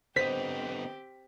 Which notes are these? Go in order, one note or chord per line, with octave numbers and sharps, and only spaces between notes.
D3 B3 C4 G4 C5 D#5 B6